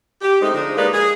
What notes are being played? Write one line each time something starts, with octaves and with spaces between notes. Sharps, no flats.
G4
G#3 A3 C4 D#4
D3 F3 G#3 D4 D#4
G#3 A#3 D#4 G4 B4 D5
G#4